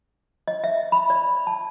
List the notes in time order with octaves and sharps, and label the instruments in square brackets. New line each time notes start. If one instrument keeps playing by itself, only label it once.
[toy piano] D#5
E5
B5
D5
A5